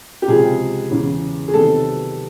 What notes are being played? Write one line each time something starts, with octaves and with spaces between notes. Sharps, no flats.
G4
C#2 C3 F3 G#4
E2 C#3 E3
G#4
C3 D#3 F#3 B3 A4